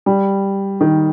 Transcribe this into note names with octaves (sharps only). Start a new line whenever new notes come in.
G3
D#3